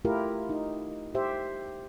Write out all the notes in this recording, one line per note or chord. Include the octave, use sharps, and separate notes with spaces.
A3 E4 F4 G4 A#4
D#4
G4 C5 E5